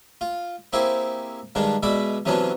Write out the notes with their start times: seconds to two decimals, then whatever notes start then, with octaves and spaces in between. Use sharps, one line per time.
0.21 F4
0.73 A#3 C4 E4 G4 G#4
1.55 G2 D#3 G#3 D4
1.83 B2 G#3 D5 E5 B5
2.25 C3 E3 F#3 B3 C#4 D4